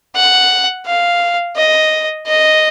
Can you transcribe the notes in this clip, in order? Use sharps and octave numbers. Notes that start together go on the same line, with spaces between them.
F#5
F5
D#5
D#5